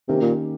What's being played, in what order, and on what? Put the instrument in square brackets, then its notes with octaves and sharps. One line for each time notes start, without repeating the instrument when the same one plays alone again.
[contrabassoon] C3 [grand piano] D#3 A#3 C#4 G4 A#4
[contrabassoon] A#2